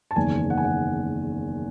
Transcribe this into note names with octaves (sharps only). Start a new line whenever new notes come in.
A5
F#1 E2 D#3 G#5
F#5
G#5
F#5